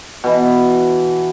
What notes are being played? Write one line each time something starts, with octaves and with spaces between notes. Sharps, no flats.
B2 E3